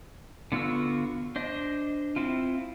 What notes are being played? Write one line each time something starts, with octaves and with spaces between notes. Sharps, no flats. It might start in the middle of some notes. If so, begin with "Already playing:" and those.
D3 B3 F4 F#4 E6
D4 C5 D#5
C4 E4 F4